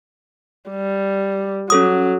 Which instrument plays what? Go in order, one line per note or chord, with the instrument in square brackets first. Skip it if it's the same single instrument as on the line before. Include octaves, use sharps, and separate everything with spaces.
[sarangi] G3
[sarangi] F#3 [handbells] C#4 A4 D#6